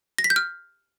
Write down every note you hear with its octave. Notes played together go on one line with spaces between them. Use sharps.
A#6
B6
G6
F6